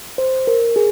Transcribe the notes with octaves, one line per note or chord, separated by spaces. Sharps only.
C5
A#4
G#4